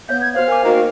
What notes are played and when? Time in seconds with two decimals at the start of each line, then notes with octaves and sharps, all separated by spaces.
0.09 B3 C#5 F5 G6
0.22 G#6
0.34 F#4 C5 C#5 F5
0.48 A#4 G#5 D6
0.65 D#3 A#3 F#4